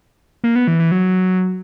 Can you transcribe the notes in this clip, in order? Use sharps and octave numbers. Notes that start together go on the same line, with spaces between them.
A#3
B3
E3
E3
F#3